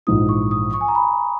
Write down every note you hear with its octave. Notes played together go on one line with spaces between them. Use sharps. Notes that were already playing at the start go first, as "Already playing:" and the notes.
A#1 G#2 E3 D#6
C#6
D#6
C#6
G#5
A#5
B5